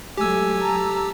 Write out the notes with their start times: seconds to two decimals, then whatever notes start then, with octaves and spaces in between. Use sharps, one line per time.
0.17 F#3 G#3 A3 G4 G#5 E6
0.59 A5 A#5